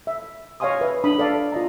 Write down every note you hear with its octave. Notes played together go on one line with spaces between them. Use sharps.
E5
C#5 D#5 F5 G#5 C6 D#6
B4 E5
D4 B5 D#6
A4 D5 F5
F4 D#5 A#5